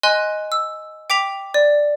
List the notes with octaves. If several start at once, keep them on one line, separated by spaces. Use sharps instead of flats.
D#5 G#5 C6 F#6
E6
G5 D6 B6 F7
D5